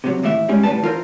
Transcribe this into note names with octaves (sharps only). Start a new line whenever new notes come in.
C3 F#3
D#2 A2 E3 E4 E5
G3 G#3 C#4
D2 A2 F3 G3 B4 A5
E3 F4 A#4 C5